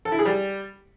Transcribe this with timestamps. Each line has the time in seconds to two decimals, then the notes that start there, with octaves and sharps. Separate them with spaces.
0.05 A4
0.12 E4
0.19 G#4
0.26 G3